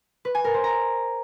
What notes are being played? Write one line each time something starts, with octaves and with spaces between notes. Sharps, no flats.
B4
G#5
A#4
C5
A#5